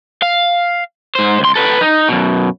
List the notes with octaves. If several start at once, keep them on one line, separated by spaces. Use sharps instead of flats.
F5
G#2 C5
C#2 C6
A4 B4
D#4
F#2 B2